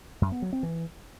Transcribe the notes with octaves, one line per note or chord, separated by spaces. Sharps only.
F#2
B3
F#3
C4
E3